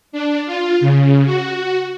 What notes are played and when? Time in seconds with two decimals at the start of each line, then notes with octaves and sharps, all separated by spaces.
0.12 D4
0.46 F4
0.81 C#3
1.26 F#4